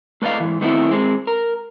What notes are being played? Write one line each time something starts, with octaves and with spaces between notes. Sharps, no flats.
A3 B4 D5 D#5 F5
G#2 E3
D#3 A3 B3 C4 D#4 E4
G#3 C4
A#4